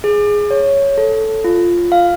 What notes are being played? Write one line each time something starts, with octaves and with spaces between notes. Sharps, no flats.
G#4
C#5
A4
F4
F5